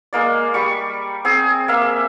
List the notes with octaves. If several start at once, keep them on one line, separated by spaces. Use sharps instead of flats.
G#3 A#3 D5
G3 C#6
C4 G#4
A#3 E5